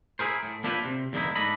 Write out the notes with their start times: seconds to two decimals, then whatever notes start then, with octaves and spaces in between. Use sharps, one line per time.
0.19 E4 G#4 A#4 C5
0.43 A2
0.64 A#3 D4 E4 F4 G4 B4
0.85 C3
1.13 E2 G2 D3 A#3 D#4 E4
1.35 G#2 A3 D4 A4 D#5 B5